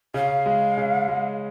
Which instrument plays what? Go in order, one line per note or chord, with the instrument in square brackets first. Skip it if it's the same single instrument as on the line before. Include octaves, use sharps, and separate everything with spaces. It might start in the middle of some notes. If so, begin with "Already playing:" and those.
[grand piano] C#3 [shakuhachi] F5
[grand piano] G#3
C#3
G#3